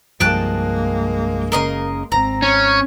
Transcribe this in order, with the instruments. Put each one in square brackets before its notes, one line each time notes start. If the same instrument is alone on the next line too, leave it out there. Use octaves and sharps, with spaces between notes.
[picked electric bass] C2 G2 F3 [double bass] G#3 A#3 [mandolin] G5 A5 F#6
[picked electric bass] F#1 C#3 [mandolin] A#4 D#5 C6
[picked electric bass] D#1 G#1 [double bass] C4 [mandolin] A#5
[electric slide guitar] C#4